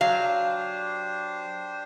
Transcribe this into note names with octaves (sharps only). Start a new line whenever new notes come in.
F#3 D4 G4 C5 F5